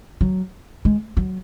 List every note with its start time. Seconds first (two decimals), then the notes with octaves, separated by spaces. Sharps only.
0.21 F#3
0.85 G#3
1.17 F#3